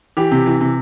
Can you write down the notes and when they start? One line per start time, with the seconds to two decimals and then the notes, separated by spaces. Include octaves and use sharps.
0.17 E3 G4
0.31 C3
0.46 E3
0.61 C3